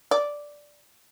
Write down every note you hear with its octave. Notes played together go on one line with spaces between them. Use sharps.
D5